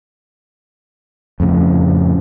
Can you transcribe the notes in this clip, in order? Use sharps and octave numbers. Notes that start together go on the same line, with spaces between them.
F2 A2 C#3